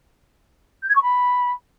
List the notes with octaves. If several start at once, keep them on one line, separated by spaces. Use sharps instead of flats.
G6
G#6
C#6
B5